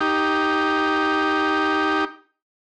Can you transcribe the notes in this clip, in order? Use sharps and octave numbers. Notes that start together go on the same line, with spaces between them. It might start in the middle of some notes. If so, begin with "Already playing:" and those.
D#4 G4